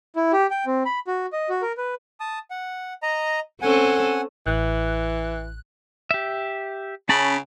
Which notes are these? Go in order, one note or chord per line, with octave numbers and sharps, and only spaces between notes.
E4
G4
G5
C4
B5
F#4
D#5
F#4
A#4
B4
A5 D#6
F#5
D#5 A#5
C4 C#4 A4 F#5 G#5
A1 E3 F#6
G4 E5
C#3 C#4 A5 B5